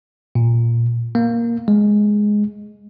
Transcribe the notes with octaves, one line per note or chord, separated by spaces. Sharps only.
A#2
A#3
G#3